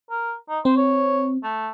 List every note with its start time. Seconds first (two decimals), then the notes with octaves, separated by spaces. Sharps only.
0.11 A#4
0.49 D#4
0.65 C4 C5
0.77 C#5
1.43 A3